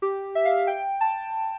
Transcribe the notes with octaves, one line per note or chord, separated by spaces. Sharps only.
G4
E5
F5
G5
A5